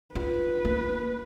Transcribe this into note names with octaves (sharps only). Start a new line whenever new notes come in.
F4 B4
A#3